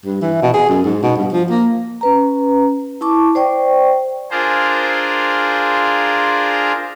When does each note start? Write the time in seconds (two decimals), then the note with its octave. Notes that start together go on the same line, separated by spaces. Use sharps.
0.05 G2
0.21 E3
0.42 B2
0.54 G#4
0.69 F#2
0.84 G#2
1.03 B2
1.17 G2
1.32 F3
1.50 A#3
2.01 C#4 B4 A#5
3.01 E4 A5 C#6 D6
3.35 C5 D5 G5 C#6
4.31 D4 F4 G#4 A#4 C5